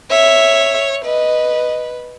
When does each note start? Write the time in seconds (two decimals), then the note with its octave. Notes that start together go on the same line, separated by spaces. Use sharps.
0.10 C#5 E5
1.05 B4 D#5